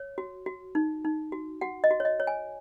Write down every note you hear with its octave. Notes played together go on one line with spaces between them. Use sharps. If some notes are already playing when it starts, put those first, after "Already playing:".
Already playing: C#5
F#4
F#4
D#4
D#4
F#4
F#4 F#5
D#5
F#4
C#5
D#5
C#5
G#5